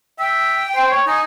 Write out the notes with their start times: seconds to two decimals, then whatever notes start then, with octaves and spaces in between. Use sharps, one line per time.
0.20 E5 G5
0.76 C5
0.91 C#5
1.07 D#4 G#5